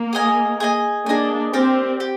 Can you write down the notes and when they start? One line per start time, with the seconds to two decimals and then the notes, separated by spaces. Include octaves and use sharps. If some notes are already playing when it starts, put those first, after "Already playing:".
Already playing: A#3
0.13 G#4 D#5 G#5
0.60 G#4 D#5 G#5
1.06 A#3 D4 G#4 D#5 G#5
1.53 C4 G4 A#4 D5
2.00 G4